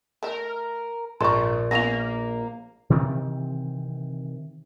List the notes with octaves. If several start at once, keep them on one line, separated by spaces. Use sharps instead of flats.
A3 A#4 E5
A#1 G#2 A4 A#4 C6 C#6
A#3 B3 C#4 F4 A#6 F7
C3 D#3 E3 C4